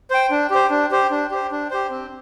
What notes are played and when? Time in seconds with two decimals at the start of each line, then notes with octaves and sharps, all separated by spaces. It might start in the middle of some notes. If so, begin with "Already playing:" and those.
0.11 C5 G5
0.31 D4
0.50 G4 C5
0.70 D4
0.91 G4 C5
1.11 D4
1.31 G4 C5
1.51 D4
1.71 G4 C5
1.90 C4